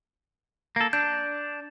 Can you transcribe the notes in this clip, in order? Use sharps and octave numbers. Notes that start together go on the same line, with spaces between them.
A#3 A4
D4 G6